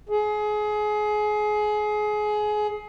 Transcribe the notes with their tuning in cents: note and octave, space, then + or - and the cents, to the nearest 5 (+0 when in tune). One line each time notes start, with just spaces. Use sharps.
G#4 +25